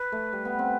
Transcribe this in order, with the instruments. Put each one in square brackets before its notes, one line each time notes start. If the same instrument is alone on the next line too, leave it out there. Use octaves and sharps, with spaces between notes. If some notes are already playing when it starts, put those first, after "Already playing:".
Already playing: [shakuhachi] B4
[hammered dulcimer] A3
G3
B3
C4